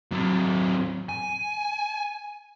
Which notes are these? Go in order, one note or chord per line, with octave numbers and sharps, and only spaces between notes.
F#3 C4
G#5